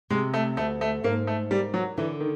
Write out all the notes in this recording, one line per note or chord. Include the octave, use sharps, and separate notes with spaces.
C3 G#3
A3
D2 A3
A3
G#2 A#3
A3
G3 A#3
F#3
D3 E3
D#3